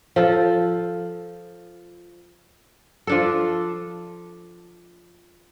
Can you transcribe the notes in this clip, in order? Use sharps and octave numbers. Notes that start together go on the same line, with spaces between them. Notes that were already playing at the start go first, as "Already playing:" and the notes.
F3 A4
F3 D4 A4